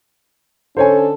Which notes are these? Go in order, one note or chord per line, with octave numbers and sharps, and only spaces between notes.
D3 C#4 A4 C5 C#5 G#5